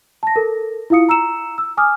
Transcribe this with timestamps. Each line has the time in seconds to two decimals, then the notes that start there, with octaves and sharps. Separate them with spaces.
0.23 A5 A#6
0.36 A4 A#4
0.90 E4 F4 F5 D#6 C#7
1.09 A#5 E6 C#7 E7
1.58 E6
1.77 G#5 D6 D#6 F6